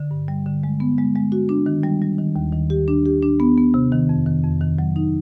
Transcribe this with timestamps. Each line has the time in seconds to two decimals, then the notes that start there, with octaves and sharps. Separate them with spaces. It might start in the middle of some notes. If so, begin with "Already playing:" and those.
Already playing: D3
0.11 G2
0.28 G3
0.46 D3
0.63 G#3
0.80 B3
0.98 G#3
1.16 G#3
1.32 F#4
1.49 D4
1.66 D#3
1.84 G3
2.02 G3
2.18 D#3
2.36 D#2
2.53 D#3
2.70 G4
2.88 D4
3.06 G4
3.22 D4
3.40 B3
3.58 B3
3.74 C3
3.92 D#3
4.09 F2
4.26 D#3
4.43 F2
4.61 D#3
4.79 F#3
4.96 D#4